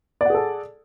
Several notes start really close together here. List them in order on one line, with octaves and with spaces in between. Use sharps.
D5 F#5 G#4 A4